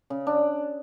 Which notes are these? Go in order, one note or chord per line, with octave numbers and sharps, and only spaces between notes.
C#3
D4